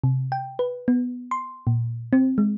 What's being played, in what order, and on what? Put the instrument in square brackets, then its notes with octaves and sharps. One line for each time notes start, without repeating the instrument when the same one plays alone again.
[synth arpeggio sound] C3
G5
B4
B3
C6
A#2
C4
G#3